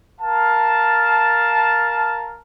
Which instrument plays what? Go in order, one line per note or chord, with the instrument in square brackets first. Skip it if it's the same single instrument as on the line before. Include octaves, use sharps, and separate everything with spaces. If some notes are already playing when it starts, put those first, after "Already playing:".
[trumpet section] A#4 F5 A5